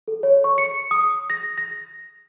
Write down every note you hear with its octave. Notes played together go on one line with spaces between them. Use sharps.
A4
C#5
C#6
C#7
D#6
A#6
A#6